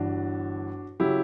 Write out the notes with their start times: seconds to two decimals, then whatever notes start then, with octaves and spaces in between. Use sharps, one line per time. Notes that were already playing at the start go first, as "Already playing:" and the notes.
Already playing: G1 G2 E3 D4 F#4
1.00 C#3 F#3 E4 G4